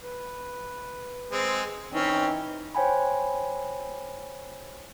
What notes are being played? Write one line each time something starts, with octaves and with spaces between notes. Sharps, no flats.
B4
G#3 C4
E3 C4 C#4 D#4
C5 C#5 G5 G#5 B5